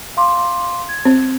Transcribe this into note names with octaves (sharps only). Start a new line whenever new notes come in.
F5 C6 D6
G#6
C4